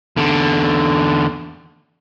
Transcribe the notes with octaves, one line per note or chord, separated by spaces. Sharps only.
E2 D3